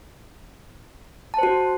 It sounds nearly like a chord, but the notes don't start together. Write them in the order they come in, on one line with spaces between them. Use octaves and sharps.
A5 C5 F#4